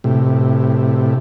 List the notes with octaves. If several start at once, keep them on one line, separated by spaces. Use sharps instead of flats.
A2 C3